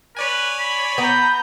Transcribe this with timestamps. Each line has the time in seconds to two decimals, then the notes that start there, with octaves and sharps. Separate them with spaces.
0.17 B4 C#5 D5 G#5
0.59 B5
0.98 B3 A#5 G6